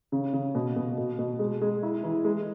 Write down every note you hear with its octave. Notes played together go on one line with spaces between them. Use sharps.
C#3
C#3
B2
B2
B2
B2
G#3
G#3
E4
E3
G#3